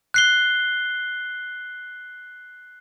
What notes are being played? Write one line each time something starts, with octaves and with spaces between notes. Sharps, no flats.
F#6 C7 G7